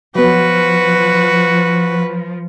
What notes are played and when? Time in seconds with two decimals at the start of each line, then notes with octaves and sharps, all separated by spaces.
0.15 F3 F#3 B3 F#4 B4